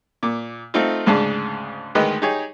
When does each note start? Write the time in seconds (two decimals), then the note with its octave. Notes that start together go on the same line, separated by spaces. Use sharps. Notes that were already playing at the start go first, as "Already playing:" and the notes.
0.23 A#2 D6
0.74 A3 C4 D#4 F4
1.06 D2 G#2 C#3 D4 A5
1.95 D2 D#3 G#3 B4 D#5
2.22 D#4 G4 G#4 C#5